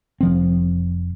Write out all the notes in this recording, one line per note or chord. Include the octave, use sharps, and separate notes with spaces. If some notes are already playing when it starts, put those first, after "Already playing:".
F1 F3 C4